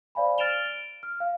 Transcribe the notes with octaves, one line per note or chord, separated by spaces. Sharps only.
C5 D5 F5 G#5 B5
F6 A6 D7 E7 F7 G7
D7
F6
F5